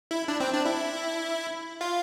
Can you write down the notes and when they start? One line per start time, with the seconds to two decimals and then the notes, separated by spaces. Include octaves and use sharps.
0.11 E4
0.28 D4
0.40 C4
0.53 D4
0.65 E4
1.81 F4